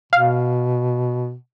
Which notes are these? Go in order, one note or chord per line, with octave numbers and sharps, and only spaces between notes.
B2 F5